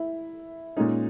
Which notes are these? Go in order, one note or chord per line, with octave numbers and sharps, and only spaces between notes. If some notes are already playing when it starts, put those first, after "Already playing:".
Already playing: E4
A#2 G#3 C#4 D#4